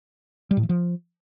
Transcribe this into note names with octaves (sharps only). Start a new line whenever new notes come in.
G3
A2
E3
F3